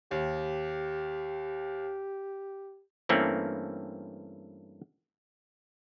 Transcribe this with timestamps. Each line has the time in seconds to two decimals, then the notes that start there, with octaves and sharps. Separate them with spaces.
0.11 D#2 G4
3.09 G2 E3 A3 A#3 C4 C#4